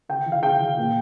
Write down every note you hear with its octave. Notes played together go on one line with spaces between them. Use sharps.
C#3 G5
E3
F5
C#3 G5
E3
A#2